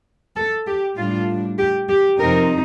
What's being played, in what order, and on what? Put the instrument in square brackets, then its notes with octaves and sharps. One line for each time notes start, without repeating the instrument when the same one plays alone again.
[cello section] A4
G4
A2 G3 D4 F4
G4
G4
F2 C3 F3 C4 D#4 A#4